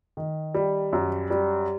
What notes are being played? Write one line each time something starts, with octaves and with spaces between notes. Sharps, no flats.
D#3
G3
F#2
G3